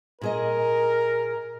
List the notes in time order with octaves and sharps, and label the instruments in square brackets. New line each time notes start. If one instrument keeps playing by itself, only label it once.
[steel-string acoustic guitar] A#2 G#4 D#5 [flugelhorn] A#4